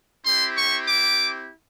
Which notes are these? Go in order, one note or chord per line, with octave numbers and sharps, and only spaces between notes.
C4 E4 G4 C6
C#6
D6